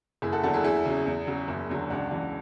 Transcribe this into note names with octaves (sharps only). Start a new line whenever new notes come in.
F#1 E4 G#4
F#4 A4
E2 D3 F#3 F#4 A4
E4 G#4
E2 E4 G#4
C#3 F#3
E2
C#3 F#3
F#1
E2 D3 F#3
C#2 D4 F#4
C#3 E3 D4 F#4